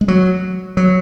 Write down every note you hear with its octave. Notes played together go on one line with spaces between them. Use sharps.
G#3
F#3
F#3